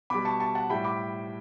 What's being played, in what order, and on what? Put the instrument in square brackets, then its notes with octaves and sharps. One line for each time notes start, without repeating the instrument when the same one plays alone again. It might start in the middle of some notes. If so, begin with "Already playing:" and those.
[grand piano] B2 G3 B5 D6
A5 C#6
A5 C#6
F#5 A5
A2 G3 G5 B5
B5 D6